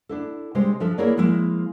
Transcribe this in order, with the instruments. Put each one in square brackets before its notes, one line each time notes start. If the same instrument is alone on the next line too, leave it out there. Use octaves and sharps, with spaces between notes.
[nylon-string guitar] D4 E4 A4
C3 G3 G#3 C5
F3 D4 A4 E5
A#3 E4 G#4 A#4 C#5 D5
F3 G#3 A#3 E4